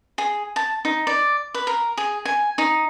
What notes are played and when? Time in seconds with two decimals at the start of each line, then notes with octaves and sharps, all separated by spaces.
0.18 G#4
0.56 A5
0.85 D#4
1.07 D5
1.54 B4
1.67 A#4
1.97 G#4
2.25 G#5
2.58 D#4